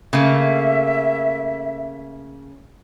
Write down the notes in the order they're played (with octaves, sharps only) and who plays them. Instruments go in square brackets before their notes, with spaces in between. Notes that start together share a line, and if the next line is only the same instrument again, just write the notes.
[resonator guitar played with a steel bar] C#3 A3 A#3 [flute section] E5